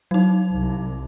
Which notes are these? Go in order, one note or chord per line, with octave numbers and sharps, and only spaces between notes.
F#3 D#4
C2